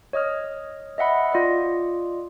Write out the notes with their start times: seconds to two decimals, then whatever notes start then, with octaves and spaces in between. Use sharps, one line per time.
0.13 C#5 D#5 D#6 F6
0.98 D#5 E5 F#5 B5
1.32 F4 D5 D#5